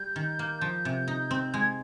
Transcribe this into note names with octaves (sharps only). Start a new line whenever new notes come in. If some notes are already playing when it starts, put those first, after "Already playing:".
Already playing: G3 G6
D#3
A#3
F3
C3
D#4
C4
G#3 G#6